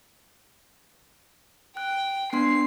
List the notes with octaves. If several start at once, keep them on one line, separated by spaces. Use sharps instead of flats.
G5 F#6
B3 D4 C6 C7